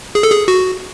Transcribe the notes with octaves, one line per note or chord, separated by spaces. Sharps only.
G#4
A4
G#4
F#4